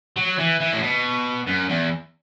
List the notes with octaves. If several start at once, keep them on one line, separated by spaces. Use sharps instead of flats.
F#3
E3
E3
A2
B2
F#2
E2